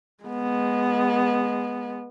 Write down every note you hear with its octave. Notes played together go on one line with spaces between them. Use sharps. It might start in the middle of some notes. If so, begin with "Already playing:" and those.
G#3 B3